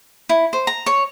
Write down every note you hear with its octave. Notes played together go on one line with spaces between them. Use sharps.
E4
C5
A#5
C#5